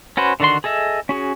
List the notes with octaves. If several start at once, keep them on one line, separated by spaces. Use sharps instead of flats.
C#4 F#4 B4 C5
D3 D#3 D4 F#4 C6
G#4 A4 D#5 E5
C#4 F#4 G#4